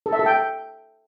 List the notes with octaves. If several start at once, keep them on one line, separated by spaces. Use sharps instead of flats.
A4
E5
A4
G5